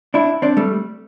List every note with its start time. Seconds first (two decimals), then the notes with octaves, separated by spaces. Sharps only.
0.14 D4 E4
0.42 C4 D4
0.57 G3 A3